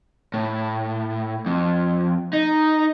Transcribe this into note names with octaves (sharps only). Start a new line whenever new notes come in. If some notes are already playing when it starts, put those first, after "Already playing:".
A2
F2
D#4